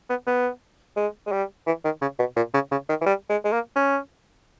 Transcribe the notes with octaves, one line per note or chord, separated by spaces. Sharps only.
B3
B3
G#3
G#3
G3
E3
D#3
C#3
B2
A#2
C#3
C#3
D#3
E3
G3
G#3
G#3
A#3
C#4